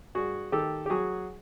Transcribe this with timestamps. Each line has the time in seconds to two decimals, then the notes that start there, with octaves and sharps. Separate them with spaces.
0.15 G2 F#4 G#4
0.52 D#3 G4 A4
0.86 G4
0.90 F#3 F#4 G#4